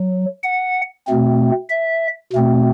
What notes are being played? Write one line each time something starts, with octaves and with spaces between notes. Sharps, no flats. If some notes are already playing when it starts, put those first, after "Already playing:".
Already playing: F#3
F#5
B2 A3 C4
E5
B2 A3 C4